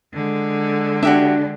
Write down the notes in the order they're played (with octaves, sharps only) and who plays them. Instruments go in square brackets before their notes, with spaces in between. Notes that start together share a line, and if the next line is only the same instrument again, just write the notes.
[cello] D3 G#3
[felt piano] D4 [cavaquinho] F#4 G4 E5